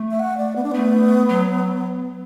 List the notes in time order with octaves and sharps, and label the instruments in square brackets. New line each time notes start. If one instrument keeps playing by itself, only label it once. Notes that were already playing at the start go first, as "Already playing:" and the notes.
Already playing: [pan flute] A3
[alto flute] E5
F#5
D5
B3
D4
[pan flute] A3 [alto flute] B3
[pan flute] F#3